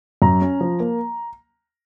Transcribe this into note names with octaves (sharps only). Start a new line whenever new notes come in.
F#2 A#5
C#4
F3
A#3